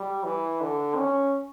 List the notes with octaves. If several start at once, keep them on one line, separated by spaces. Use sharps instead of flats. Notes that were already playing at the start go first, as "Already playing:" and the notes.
Already playing: G3
E3
D3
C#4